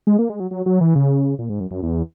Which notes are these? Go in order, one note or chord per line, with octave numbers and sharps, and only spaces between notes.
G#3
A#3
G#3
F#3
F#3
F#3
E3
C#3
A#2
G#2
F#2
F#2
E2